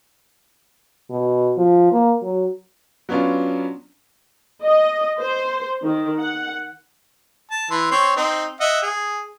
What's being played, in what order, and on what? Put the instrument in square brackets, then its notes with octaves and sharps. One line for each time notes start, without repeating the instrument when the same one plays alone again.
[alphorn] B2
F3
A#3
F#3
[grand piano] F#3 B3 C#4 D4 F4
[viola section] D#5
C5
D#3
F#5
[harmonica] A5
E3 C6
C4 C#5 C6
C4 D#4
D#5 E5 F#5
G#4